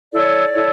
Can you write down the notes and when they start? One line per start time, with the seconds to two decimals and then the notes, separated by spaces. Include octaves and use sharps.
0.11 E4 A4 C#5 D5
0.52 E4 A4 C#5